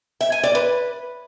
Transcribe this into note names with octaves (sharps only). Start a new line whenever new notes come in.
E5
G#5
D5
B4